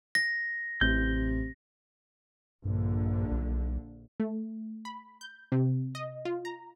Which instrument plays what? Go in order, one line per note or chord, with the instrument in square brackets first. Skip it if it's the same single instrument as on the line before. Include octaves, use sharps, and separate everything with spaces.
[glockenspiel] A#6
[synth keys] A1 [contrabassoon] C3 [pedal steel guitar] G6
[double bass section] A#1 D3 [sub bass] G2
[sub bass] B1
[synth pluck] A3
B5
G6
C3
D#5
F4
A#5